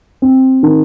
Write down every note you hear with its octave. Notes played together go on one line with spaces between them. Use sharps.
C4
D#3